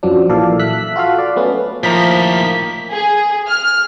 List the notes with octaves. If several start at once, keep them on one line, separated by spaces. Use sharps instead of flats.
F#2 F3 F#3 D4
A#1 A#2 E3 A4 D5 F5
E5 F#6 B6
F4 F#4 A4 F5
D5
F#3 A3 B3 C#4 F#4
A2 D#3 F3 A#3 A#5 B6
G#4
F6